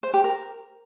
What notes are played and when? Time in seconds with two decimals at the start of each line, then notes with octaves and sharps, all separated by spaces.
0.03 C5
0.14 G4
0.24 A#4